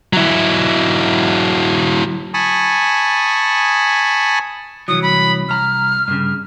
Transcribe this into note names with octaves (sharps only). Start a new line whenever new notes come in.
F#3 E4
G#5 A5 B5 C#6 D#6
C2 E3 F#3 D#6
B5
C2 A#5 F6
G2 C#3